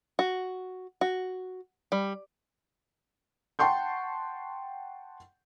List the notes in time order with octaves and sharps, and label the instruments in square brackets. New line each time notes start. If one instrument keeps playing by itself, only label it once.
[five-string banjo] F#4
F#4
G3
[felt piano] F#5 G5 A5 C6 C#6 G6